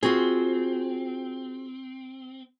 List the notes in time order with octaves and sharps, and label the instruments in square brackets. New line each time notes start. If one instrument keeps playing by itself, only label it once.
[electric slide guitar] C4 [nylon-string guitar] F4 F#4 G#4